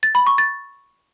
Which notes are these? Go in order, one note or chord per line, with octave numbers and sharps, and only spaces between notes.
A6
B5
C#6
A6